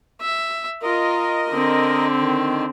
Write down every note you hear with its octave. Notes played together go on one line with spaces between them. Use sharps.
E5
F4 A#4 D#5
D3 C4
D#3